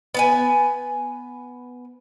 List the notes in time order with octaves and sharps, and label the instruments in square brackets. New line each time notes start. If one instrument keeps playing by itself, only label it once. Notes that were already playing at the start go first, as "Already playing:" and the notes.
[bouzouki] B3 B4 G#5